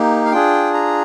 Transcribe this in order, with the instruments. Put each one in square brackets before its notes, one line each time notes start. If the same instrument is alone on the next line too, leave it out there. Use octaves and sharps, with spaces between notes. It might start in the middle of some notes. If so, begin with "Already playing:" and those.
Already playing: [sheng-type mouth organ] A#3 D#4 G4
F5
D4 F4 G#4 G5
A#5